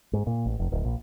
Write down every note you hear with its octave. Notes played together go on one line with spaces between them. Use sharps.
G#2
A#2
A1
F1
D1
A#1